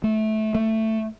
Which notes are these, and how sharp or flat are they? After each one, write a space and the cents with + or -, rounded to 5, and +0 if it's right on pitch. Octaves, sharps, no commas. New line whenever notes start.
A3 -20
A3 +10